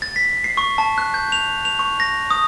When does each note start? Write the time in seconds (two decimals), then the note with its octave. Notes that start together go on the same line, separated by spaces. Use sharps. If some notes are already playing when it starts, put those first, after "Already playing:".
0.02 A6
0.16 B6
0.44 C7
0.57 C#6
0.78 A5
0.98 F#6
1.14 G6
1.32 F7
1.65 F7
1.79 C#6
2.00 A#6
2.31 D#6